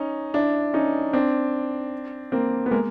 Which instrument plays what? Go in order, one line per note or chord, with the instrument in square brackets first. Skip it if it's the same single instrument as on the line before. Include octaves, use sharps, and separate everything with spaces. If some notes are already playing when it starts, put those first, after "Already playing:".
Already playing: [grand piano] C#4 D#4
D4 E4
C#4 D#4
C4 D4
A#3 C4
B3
G#3 A#3